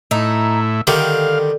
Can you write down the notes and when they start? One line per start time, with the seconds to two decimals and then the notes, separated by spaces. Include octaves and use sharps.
0.11 A2 D#4 E4
0.87 D3 D#3 G3 F5